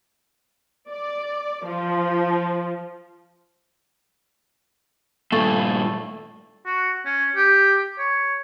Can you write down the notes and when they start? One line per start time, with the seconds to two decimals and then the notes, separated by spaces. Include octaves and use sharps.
0.88 D5
1.65 F3
5.32 G2 A#2 A3 A5
6.65 F#4
7.05 C#4
7.36 G4
7.99 C#5